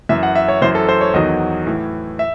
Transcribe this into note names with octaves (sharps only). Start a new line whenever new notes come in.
F#2 E3 E5
F#5
E5
C#5
F#2 E3 C5
A4
C5
C#5
E2 D#3 F#3 D#5
A2 E3
E5